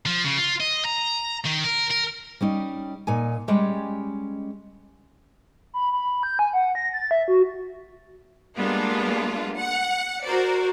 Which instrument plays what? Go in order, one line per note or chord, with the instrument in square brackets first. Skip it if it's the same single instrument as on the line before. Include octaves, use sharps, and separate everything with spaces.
[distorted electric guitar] F3
C#3
F4
D#5
A#5
D#3
A#4
A#4
[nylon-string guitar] G3 C#4 D#4
A#2 D#4 G#5
G3 G#3 C#4 G4
[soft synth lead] B5
B5
G6
G#5
F#5
A#6
A6
E5
F#4
[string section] G3 G#3 A#3 B3 D4 F4
F#5
F#4 A#4 C5 D5